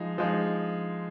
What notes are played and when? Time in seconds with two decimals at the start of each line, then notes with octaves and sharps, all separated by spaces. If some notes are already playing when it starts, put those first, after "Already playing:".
Already playing: F3 G#3 D#4
0.18 F3 G#3 D#4